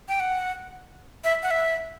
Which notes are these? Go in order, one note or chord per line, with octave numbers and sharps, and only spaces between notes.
G5
F#5
E5
F#5
E5